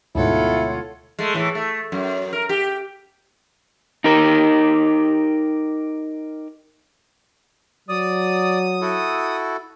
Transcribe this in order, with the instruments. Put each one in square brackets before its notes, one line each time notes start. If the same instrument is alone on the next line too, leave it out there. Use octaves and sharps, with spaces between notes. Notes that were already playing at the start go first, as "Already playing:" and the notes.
[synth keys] D2 G#2 B2 [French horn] E4 [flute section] F4 C#5 F#5 [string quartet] A4
[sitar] G#3 A3
A2 E3
A3
F#2
A#4
G4
[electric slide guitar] D#4 G4 A#4
[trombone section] F#3 [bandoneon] D5 [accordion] D#6
[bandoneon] E4 F#4 A4